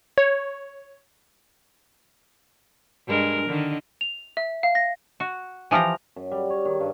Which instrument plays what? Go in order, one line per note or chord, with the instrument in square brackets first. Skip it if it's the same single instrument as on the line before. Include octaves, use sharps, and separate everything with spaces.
[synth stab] C#5
[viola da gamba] G2 G#3 A#4
D3 D#3 D#5
[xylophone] F7
E5
F5
A#6
[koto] F#4
E3 F3 F4 G4 A#5
[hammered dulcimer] F#2
G3
C#5
D#3
G2